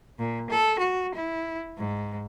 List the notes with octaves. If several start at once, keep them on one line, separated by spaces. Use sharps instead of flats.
A#2
A4
F#4
E4
G#2